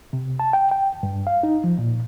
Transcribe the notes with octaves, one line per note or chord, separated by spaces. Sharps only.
C3
A5
G5
G5
G2
F5
D#4
F3
A#2